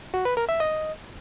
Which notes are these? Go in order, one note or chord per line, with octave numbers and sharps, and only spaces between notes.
F#4
B4
A#4
E5
D#5